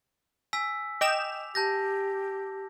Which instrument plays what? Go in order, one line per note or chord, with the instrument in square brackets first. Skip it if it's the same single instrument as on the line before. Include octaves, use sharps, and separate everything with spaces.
[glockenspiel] G#5 E6 B6
[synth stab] D#5 G5 E7 [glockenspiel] D6 F7
[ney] G4 [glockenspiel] A5 G6 A#6